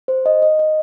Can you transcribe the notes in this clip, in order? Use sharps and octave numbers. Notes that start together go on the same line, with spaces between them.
C5
D#5
D#5
D#5